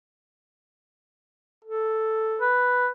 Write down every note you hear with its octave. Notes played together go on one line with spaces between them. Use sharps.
A4
B4